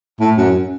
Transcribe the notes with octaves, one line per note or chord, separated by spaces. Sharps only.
A2
F#2